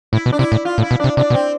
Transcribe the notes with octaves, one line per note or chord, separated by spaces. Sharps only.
A2 E4
B2
D4
C3 E4
A2
F4
A2
E4
B2
C3 D4
C3 D4
B2
C4